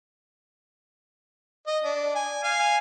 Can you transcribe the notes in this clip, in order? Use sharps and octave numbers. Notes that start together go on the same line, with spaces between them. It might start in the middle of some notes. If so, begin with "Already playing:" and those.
D#5
D4
G#5
F5 G#5